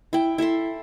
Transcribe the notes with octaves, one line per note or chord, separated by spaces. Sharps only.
E4 G5
E4 A4 E5 C6